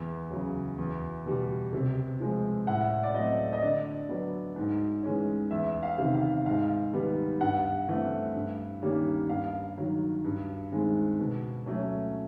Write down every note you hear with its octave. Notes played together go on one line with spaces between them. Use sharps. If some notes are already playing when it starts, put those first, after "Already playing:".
Already playing: E2
C#3 F#3
E2
B2 G3
C3
F3 G#3 C4
A2 F#5
D5
F#3 A3 C4 D#5
D#5
D3 D5
F#3 B3
G#2
E3 G#3 C#4
E2 E5
F5
C3 D#3
F5
G#2 F5
D#3 G3 B3
G2 F#5
E3 A3 C4
G2
D#3 G3 A#3 C#4
G2 F5
D#3 F#3
G2
D#3 G#3 C4
B2
F#3 A3 C#4